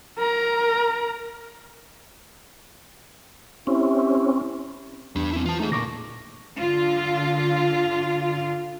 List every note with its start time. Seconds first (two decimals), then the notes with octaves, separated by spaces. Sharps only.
0.18 A#4 A#5
3.67 C4 C#4 E4 G4
5.16 E2 D4 G4
5.32 C4 E4
5.46 E3 F4 A5
5.60 A3 D#4 G#4
5.72 D2 A#2 C#6 D6 A#6
6.58 D3 F4